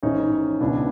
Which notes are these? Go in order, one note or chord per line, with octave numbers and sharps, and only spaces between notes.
A1 G#2 D#3 C#4 D#4
C#2 B2 D4 E4